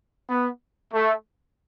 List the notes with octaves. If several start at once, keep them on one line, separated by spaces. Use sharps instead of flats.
B3
A3